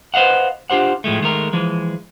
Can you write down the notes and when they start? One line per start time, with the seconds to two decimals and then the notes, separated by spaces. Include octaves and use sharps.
0.14 B4 C5 D#5 F5 F#5
0.70 D4 F4 G4 C5 F#5
1.04 A2 F3 G#3 A3
1.21 D#3 G#3 A3 A#4
1.53 E3 F3 G#3